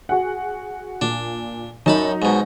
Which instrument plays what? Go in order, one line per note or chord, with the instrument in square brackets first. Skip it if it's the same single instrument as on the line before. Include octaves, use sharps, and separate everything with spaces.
[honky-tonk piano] F#4 G#4 F#5
[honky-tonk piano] A#2 [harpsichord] D4
[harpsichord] F#2 A5 B5 [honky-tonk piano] F#3 D#4
[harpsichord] G#2 B2